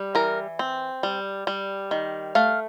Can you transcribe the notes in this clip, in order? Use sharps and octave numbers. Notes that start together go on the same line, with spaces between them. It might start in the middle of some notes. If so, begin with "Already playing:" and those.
Already playing: G3
E3 A#4
C4
G3
G3
D#3
A3 F5